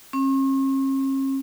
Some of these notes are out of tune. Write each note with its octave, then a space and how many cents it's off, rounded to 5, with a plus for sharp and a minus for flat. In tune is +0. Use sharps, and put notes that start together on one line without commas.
C#4 -45